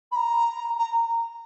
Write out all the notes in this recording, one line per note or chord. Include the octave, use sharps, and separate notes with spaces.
B5
A#5
A#5